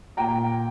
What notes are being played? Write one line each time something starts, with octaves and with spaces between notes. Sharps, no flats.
A#2 G5 A#5